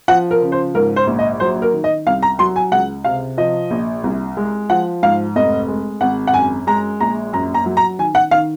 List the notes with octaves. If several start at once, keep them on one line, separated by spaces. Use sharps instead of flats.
F3 F#5
A#4
C#3
C5
G#2 A#4
C5
A#1
D#5
F#3 C5
A#4
D#3
D#5
C2 F5
A#5
F#3 C6
G#5
C#2 F#5
C3 F5
F3 D#5
A#1
C2
G#3
F3 F#5
G#2 F5
F1 D#5
G#3
G#1 F#5
F#5
F#2 G#5
G#3 A#5
A#1 A#5
F#2 A#5
A#5
F#3
A#5
D#3 G#5
F#5
D#3 F5